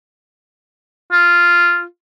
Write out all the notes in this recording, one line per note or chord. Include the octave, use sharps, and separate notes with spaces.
F4